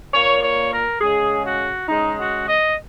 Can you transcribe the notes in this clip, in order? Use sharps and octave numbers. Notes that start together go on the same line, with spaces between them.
A#2 A#3 C#5
C#5
A#4
C#3 G#3 G#4
F#4
C#3 G#3 D#4
F#4
D#5